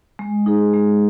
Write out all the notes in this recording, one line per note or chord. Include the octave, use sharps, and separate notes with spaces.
G#3
D#4 G#4
G#3